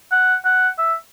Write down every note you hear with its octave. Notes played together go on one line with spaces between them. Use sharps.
F#5
F#5
E5